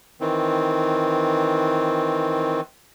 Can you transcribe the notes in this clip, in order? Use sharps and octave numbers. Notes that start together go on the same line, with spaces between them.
D#3 E3 C4